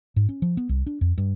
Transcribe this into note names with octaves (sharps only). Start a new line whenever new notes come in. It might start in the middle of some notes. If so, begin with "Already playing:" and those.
G#2
C#4
F3
B3
C2
D4
F2
G2